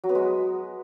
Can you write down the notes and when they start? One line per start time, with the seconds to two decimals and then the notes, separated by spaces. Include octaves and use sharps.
0.04 F#3
0.09 B3
0.15 G#3